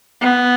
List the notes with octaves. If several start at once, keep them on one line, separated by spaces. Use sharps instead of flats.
B3